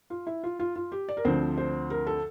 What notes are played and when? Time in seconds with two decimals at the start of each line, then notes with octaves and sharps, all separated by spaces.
0.10 F4
0.27 E4
0.43 F4
0.59 F4
0.76 F4
0.92 G4
1.09 D5
1.17 A#4
1.25 D2 D3 F3 C4 C5
1.58 C5
1.90 A#4
2.07 A4